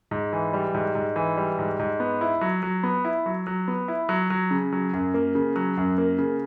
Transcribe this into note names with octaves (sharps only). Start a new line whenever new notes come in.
G#2
E3
G3
G#2
G#2
E3
G3
G#2
G#2
B3
E4
F#3
F#3
B3
E4
F#3
F#3
B3
E4
F#3
F#3
C#3
F#3
F#2
A#3
C#3
F#3
F#2
A#3
C#3